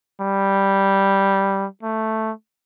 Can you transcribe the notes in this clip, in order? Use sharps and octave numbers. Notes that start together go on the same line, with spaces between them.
G3
A3